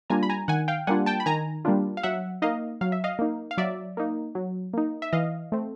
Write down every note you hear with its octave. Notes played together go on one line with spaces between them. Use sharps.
G3 A#3 D4 F4 G#5 A#5
B5
G#5 A#5
D#3 F#5 G#5
F5 G5
G3 A#3 D4 F4 F#5 G#5
G5 A5
B5
D#3 G#5 A#5
G3 A#3 D4 F4
F5
F#3 E5 F#5
A#3 D#4 D#5 F5
F#3 F5
E5
D#5 F5
A#3 D#4
F5
F#3 D5 E5
A#3 D#4
F#3
A#3 D#4
E5
E3 D#5 F5
A3 C4